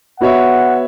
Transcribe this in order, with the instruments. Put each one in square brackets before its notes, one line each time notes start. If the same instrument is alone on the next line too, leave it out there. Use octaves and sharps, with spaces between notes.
[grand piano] B3 F#4 C#5 E5 [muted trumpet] F#5